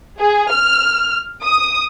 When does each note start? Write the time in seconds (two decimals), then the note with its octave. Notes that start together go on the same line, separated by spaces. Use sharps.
0.20 G#4
0.51 F6
1.45 D#6